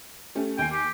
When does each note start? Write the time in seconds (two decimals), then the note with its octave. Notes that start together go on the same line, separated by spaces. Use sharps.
0.35 A3 C#4 G4
0.58 D#2 G5 G#5 C7
0.72 G4